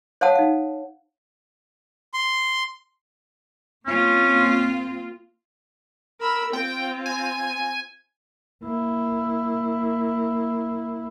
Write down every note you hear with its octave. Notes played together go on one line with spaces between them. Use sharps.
C5 C#5 F5 F#5 A5 D#6
D#4 F5
C6
A#3 C4 C#4 F4
A#4 B5 E6
C4 F4 G5
G#5
A#3 E4